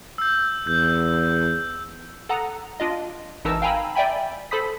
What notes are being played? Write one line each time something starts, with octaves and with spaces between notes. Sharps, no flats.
E6 G6
E2 G6
A4 F#5 A#5 D#6
D4 F4 D#5
G#1 E3 D#4 A#4 A5 E6
F5 G5 G#5 A#5 B5 E6
D5 E5 G5 G#5 B5
A4 C5 B5 D#6 B6